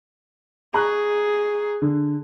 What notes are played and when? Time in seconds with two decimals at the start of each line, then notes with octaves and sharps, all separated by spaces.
0.74 G#4 A#5 C#6 F#6
1.82 D3